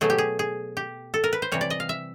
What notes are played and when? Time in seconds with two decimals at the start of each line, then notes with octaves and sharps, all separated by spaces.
0.01 B2 F#3 A3 G#4
0.10 G4
0.18 G#4
0.39 G#4
0.77 G4
1.14 A4
1.24 A#4
1.33 B4
1.42 C5
1.52 C3 E3 G3 C#5
1.61 D5
1.70 D#5
1.80 F5
1.89 E5